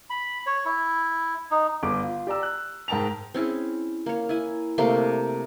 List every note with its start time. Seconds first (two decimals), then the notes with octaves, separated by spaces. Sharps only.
0.10 B5
0.46 C#5
0.65 E4
1.51 D#4
1.83 G1 D6
2.03 F4
2.27 G4 D5 A#5 E6
2.43 F#6
2.88 G#2 A#4 G5 A5 F7
3.34 C4 C#4 E4 G#4
4.06 A#3 C#5
4.29 E4 G#5
4.78 C3 A3 A#3 C6